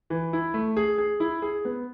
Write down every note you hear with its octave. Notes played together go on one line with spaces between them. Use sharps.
E3
E4
A3
G#4
G#4
E4
G#4
B3